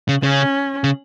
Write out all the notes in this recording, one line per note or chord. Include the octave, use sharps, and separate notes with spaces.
C#3
C#3 C#4
C#3